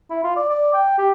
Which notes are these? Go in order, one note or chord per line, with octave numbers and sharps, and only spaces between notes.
E4
F4
D5
D5
G5
G4